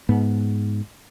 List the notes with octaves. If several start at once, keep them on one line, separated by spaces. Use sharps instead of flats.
G#2 B3